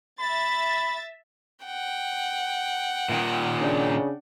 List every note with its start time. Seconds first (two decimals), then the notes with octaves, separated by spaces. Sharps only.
0.19 E5 B5 A6
1.66 F#5 G5
3.09 A#2 D#3
3.61 C#3 D4 D5